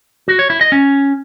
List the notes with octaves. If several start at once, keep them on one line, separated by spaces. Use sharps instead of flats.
F#4
C#5
E4
D#5
C#4